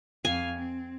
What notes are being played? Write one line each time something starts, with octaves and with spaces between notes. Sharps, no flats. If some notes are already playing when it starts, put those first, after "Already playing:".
F2 F5 G#5
C4